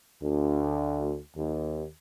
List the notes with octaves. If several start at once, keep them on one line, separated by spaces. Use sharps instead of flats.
D2
D#2